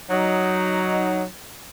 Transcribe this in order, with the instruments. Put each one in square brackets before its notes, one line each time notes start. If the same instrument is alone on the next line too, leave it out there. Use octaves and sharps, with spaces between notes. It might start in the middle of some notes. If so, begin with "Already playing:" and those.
[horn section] F#3 D#4